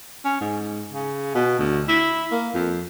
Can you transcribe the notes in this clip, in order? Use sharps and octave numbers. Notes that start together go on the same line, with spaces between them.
C#4
G#2
C#3
B2
D2
E4
A#3
F2